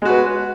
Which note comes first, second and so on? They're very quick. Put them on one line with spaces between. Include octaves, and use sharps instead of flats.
G#3 F#4 B4